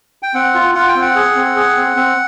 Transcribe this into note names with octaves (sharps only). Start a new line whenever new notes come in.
G5
C4 F#5
F4
F4 F#5
G5
C4
F#5
G#4
C4
G#4
C4
C4